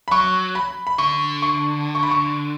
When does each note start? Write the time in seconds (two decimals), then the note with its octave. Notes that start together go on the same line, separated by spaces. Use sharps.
0.08 B5
0.11 F#3 C#6
0.55 B5
0.87 B5
0.98 D3 C#6
1.42 C#6
1.95 C#6
2.03 B5
2.11 C#6